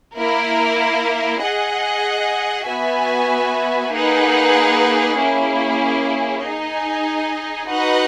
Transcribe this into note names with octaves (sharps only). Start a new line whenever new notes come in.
A#3 E4 A#4
G#4 D#5 F#5
B3 F#4 B4 E5 G#5
A#3 D#4 G#4 B4 F#5
A#3 C#4 E4 G#4
D#4 G#4 D#5 G#5
D#4 F#4 B4 D#5 F#5